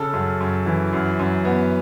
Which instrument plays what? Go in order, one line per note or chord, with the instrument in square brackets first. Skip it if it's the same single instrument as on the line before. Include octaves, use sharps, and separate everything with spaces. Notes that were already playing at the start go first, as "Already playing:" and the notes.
Already playing: [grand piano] C#3 A4
F#2
F#2
E3
F#2
F#2
B3